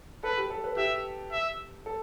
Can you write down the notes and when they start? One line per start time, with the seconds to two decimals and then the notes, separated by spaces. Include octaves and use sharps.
0.23 A4 B4
0.37 G4
0.50 A4
0.64 B4
0.77 G4 E5
1.32 E5
1.86 A4